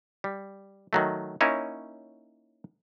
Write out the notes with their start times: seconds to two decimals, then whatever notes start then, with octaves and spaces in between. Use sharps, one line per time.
0.24 G3
0.93 D#3 F#3 A3
1.41 A#3 C#4 D#4 E4 C#5